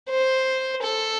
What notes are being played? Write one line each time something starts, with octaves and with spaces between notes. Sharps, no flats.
C5
A4